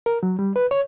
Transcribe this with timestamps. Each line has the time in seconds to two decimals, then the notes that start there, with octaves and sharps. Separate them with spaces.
0.06 A#4
0.23 F#3
0.39 G3
0.56 B4
0.71 C#5